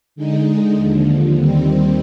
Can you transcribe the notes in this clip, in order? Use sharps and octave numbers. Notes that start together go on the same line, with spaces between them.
D3 G#3 D#4
D#2 D3 F3
D#2 D#3 G3 C4